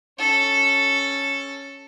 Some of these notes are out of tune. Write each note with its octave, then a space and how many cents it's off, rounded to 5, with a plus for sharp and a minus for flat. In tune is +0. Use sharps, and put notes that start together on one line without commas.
C#4 +0 A4 +0